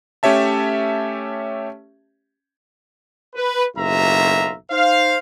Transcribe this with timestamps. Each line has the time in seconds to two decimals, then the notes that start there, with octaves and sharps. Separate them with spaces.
0.23 A3 C#4 G4 C#5 E5 A5
3.36 B4
3.77 F#1 B1 F4 E5 A#5
4.71 D#4 C5 F5